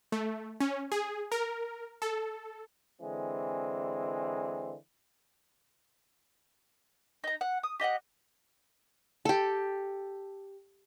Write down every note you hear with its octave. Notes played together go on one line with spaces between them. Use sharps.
A3
C#4
G#4
A#4
A4
D3 E3 G#3 C4
D#4 A#5
F#5
D#6
G4 D#5 F5 F#5
G4 A4